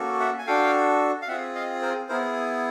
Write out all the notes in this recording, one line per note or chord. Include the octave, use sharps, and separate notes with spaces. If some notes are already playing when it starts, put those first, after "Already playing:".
Already playing: A#3 C#4 F#4 A4
E5 F#5
G#5
D4 F#4 A4 F5 G5
F5
C4 F4 G#4 E5 F#5
D#5 F5
A#4 C5
B3 E4 G#4 A#4 C5